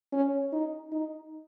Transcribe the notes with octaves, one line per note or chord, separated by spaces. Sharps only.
C#4
D#4
D#4